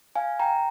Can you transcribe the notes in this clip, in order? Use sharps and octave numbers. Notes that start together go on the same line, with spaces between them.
F5 G#5
G5 A#5